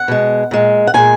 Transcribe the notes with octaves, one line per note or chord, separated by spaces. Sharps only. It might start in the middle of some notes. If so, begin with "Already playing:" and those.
Already playing: F#5
B2 G#3
A#2 G#3
F#5
A#2 G#3 G#5